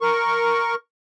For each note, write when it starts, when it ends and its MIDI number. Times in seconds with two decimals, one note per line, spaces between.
0.01 0.75 70
0.01 0.75 85